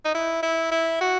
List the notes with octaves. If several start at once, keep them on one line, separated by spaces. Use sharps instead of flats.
D#4
E4
E4
E4
F#4